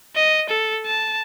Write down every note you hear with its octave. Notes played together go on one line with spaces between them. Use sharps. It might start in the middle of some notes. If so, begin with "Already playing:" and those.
D#5
A4
A5